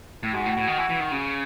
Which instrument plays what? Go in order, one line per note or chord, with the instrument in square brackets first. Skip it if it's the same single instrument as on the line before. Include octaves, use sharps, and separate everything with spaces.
[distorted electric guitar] A2
[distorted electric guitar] G#2 [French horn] F#4
[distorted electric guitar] A2
A2
D#3
E3
E3
D#3
C#3